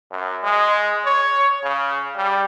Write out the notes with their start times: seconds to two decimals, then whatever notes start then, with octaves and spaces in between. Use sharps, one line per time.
0.11 F#2
0.43 G#3
1.06 C#5
1.63 C#3
2.16 G3